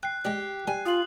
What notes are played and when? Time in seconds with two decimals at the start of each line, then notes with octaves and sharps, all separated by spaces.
0.03 G5 F#6 C7
0.25 G#3 G4 D5
0.67 G3 G#5
0.86 F4 D#6 F#7